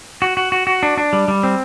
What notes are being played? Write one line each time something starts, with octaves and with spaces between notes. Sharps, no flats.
F#4
F#4
F#4
F#4
D4
D4
G3
G3
C4